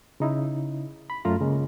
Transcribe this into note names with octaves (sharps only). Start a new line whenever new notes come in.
C#3 D#4 E4
B5
F#2 A3 F4 A#5
C#3 G#3 A#3